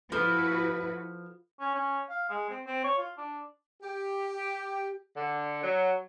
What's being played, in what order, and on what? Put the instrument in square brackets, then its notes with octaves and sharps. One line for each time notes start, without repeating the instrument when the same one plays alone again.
[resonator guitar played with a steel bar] F3 A4 [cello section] E4 F#4 B4
[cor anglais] C#4
C#4
F5
G#3
C4
C4
C#5
F4
D4
[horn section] G4
D3
F#3